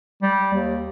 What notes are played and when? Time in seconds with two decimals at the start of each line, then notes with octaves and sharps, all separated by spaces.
0.22 G3
0.54 D#2